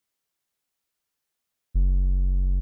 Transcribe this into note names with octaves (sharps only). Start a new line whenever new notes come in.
F#1